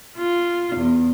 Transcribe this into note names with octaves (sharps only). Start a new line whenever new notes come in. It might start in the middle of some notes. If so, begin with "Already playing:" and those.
F4
E2